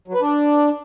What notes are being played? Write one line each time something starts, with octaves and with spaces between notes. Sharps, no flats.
F#3
B4
D4